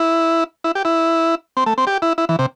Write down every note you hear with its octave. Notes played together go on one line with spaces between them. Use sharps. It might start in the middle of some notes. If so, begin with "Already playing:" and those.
Already playing: E4
E4
G4
E4
C4
A3
C4
G4
E4
E4
E3
C3